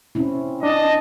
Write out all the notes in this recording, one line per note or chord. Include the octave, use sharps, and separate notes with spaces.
C4 C#4 E4
D4 D#5 A5